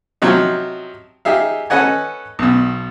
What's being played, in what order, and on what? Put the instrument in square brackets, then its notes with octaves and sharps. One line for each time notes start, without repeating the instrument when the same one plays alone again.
[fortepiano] C3 F3 F#3 D#4
D#4 G4 G#4 E5 F5
C#4 A4 B4 D#5 F#5 G#5
B1 B2